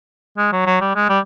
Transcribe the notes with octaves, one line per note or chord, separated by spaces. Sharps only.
G#3
F#3
F#3
G3
G#3
G3